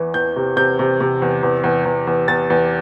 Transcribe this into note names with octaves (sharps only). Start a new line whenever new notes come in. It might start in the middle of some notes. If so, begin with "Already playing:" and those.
Already playing: E2 E3
E2 G6
C3
C3 G6
C3
C3
E2
E2
E2
E2
E2
E2 A6
E2